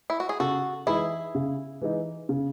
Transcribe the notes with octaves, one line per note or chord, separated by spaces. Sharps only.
E4
F#4
G#4
C#3 F#4 A4
E3 G#3 D#4 E4 G#4
C#3
E3 G#3 D#4
C#3